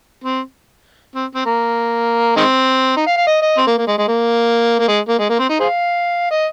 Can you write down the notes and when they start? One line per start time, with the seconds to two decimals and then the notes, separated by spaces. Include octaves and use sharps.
0.24 C4
1.15 C4
1.35 C4
1.45 A#3
2.36 D#3 G#3 C4
2.97 D#4
3.07 F5
3.17 F5
3.27 D#5
3.42 D#5
3.57 C4
3.67 A#3
3.78 A#3
3.87 G#3
3.98 G#3
4.08 A#3
4.79 A#3
4.88 G#3
5.09 A#3
5.19 G#3
5.29 A#3
5.39 C4
5.49 D#4
5.60 G#4 C5 F5
6.31 D#5